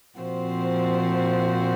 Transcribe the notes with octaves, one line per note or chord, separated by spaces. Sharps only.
A#2 F3 C4 F#4 C5